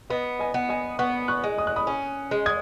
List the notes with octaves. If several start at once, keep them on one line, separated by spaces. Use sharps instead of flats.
B3 B4 D#5
D#5 G#5
B3
D#5 G#5
B3 C#6 F#6
C#6 F#6
G#3
D#6
F#6
B5 D#6
C#4
G#3
D#6 G#6